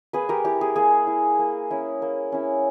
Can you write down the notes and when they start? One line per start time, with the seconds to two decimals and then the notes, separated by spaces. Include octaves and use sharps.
0.13 A#3 G#4 B4
0.29 G4 A#4
0.44 E4 G4
0.61 G#4
0.76 A#3 G#4
1.07 E4
1.39 A#3
1.71 C#4 E4
2.02 A#3
2.32 C#4 E4